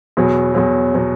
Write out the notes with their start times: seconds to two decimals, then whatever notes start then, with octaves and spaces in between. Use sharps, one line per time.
0.17 E2 B2 F#3
0.55 E2 B2 F#3
0.94 B2 F#3